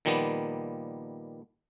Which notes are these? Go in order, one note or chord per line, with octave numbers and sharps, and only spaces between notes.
A#2 D#3 F3 G3 A#3 B3